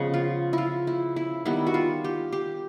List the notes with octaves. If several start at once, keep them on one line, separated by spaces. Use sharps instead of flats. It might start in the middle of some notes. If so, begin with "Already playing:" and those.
Already playing: C#3 F3 G#3 B3
F4
E4 F4
E4
E4
D#3 G3 B3 E4
F#4
F4
G4
G4